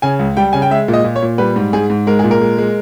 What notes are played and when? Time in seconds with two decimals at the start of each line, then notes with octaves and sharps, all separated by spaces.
0.02 C#3 G#5
0.19 C#2
0.37 G3 G5
0.53 C#3 G#5
0.62 G5
0.71 G#3 E5
0.88 A#2
0.93 D#5
1.04 A#2
1.16 C#5
1.22 A#2
1.38 G3 B4
1.56 G#2
1.73 G#2 G#4
1.90 G#2
2.07 G#3 A#4
2.19 A#2 G#4
2.31 A#4
2.41 G#3
2.58 G#3